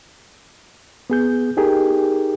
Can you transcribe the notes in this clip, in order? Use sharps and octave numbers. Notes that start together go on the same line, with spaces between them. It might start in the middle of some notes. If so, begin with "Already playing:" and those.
B3 G#4 G6
D#4 G4 G#4 A#4